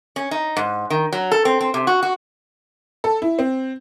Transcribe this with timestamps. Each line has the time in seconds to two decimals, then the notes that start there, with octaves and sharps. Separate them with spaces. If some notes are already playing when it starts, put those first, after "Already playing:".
0.16 C#4
0.31 D#4
0.57 G#2
0.90 D#3
1.12 F#3
1.31 A4
1.45 C4
1.60 C4
1.74 C3
1.87 F#4
2.03 F#4
3.04 A4
3.22 E4
3.39 C4